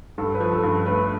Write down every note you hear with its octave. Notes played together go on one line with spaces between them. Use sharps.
G2 A4
B4
F3
A4
G2
A4
A3 B4